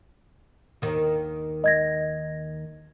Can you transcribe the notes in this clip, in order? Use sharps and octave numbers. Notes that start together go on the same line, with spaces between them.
D#2 D#3
D#5 G#6 A#6